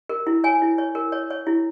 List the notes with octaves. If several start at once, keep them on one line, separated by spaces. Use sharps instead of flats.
A#4
E4
C#5 G#5
E4
C#5
A#4
C#5
C#5
E4